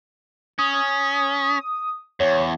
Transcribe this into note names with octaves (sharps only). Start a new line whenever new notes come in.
C#4 D#6
E2 C#5